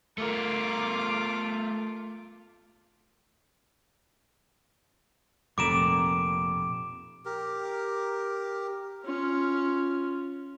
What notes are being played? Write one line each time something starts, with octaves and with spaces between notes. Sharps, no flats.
A3 F4 A#4 D6
F1 A#2 A#5 D6 D7 E7
G4 A#4
C#4 F4